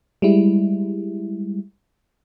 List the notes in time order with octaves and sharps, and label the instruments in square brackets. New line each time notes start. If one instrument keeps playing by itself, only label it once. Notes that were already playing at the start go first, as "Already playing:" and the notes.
[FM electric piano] G3 G#3 E4